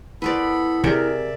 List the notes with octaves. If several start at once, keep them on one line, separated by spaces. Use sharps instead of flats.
B3 E4 A4 B4 C5 D5 B5
C3 G#4 A#4 D5 E5